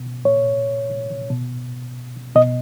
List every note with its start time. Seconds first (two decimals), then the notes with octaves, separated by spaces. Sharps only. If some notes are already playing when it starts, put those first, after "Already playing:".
Already playing: B2
0.25 A#2 C#5
1.30 B2
2.35 B2 D#5